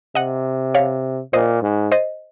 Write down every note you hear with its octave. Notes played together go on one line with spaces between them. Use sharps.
C3 D#5 F#5
C#5 F5
A#2 C5 D#5
G#2
C5 D#5